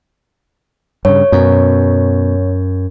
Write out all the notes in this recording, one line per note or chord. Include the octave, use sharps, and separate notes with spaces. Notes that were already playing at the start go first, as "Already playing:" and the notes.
G2 C#3 C#5
F#2 B2